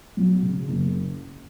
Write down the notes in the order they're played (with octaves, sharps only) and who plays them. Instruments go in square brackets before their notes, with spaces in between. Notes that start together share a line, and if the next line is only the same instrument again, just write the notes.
[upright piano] F#3
C#3
F#1